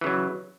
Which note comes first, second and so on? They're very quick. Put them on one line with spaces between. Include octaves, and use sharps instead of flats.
E3 C#3 F#3